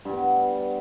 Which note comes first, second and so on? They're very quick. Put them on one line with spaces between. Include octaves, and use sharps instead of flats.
G2 G3 B3